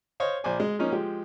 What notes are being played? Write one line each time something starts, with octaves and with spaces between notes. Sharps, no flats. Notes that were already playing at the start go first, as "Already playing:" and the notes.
C5 C#5 D#5 F5
A#1 C5 D5 G#5
G#3
F3 A#3 C#4 D#4
F3 G#3 G4